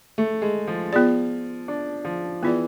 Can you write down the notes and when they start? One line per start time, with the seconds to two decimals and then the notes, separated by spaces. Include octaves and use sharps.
0.18 A3
0.42 G#3
0.67 F3
0.93 B3 F4 G#4 D5
1.68 D4
2.05 F3
2.43 E3 B3 F4 G#4 D5